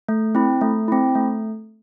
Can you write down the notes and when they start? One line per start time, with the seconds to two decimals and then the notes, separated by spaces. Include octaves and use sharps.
0.09 A3
0.35 C4 E4
0.61 A3
0.88 C4 E4
1.15 A3